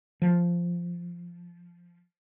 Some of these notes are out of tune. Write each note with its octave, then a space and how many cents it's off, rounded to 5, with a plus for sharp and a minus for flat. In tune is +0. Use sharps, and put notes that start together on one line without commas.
F3 -5